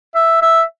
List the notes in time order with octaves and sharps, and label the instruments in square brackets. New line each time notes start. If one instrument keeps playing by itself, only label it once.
[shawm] E5
E5